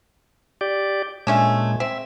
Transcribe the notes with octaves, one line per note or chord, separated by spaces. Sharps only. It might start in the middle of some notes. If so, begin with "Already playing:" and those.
G4 D5
A#2 G#3 A3 C#4 D4
C4 E5